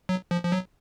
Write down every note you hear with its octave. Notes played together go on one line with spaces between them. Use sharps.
F#3
F3
F3
F#3